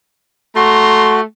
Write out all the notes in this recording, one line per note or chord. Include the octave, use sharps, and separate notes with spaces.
A3 F#4 A#5 C6